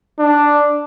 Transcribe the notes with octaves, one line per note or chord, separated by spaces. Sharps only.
D4